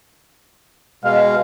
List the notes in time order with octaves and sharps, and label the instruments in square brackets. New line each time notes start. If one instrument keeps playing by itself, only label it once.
[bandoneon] B2 G#3 [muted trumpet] F5